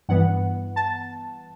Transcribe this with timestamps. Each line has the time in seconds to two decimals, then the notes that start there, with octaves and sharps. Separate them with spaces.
0.09 G2 E3 B3 F#5
0.76 A5